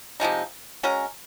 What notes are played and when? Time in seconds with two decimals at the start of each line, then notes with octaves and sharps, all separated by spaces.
0.20 C3 F3 G#3 D#4
0.83 G#3 C#4 F#4 A#4